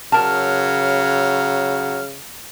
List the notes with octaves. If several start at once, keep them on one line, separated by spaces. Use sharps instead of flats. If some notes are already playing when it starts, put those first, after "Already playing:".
C#3 F#3 A#4 A5 F6